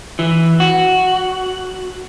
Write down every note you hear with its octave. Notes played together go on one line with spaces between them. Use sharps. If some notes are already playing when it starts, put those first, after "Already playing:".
E3
F#4